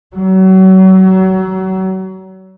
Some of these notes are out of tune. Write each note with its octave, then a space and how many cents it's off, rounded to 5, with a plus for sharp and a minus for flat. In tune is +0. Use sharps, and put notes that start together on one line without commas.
F#3 +30